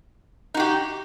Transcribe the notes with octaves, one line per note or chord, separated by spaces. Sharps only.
D#4 F#4 G4